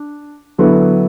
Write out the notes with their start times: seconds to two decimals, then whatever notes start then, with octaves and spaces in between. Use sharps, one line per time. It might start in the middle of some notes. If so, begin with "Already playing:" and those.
Already playing: D4
0.58 D3 F#3 B3 E4